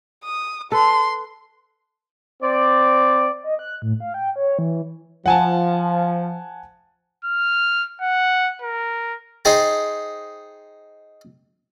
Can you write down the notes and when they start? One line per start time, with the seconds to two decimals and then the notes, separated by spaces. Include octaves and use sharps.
0.24 D#6
0.72 A4 B4 C6
2.43 C4 D5
3.43 D#5
3.59 F#6
3.82 A2
4.00 F5
4.14 G5
4.36 C#5
4.59 E3
5.26 F3 F#5 G#5 A5
7.25 F6
8.02 F#5
8.62 A#4
9.45 D#4 G#4 C5 G5 A5